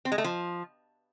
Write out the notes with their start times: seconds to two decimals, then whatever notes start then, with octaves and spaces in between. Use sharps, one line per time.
0.05 C4
0.12 G#3
0.18 A3
0.24 F3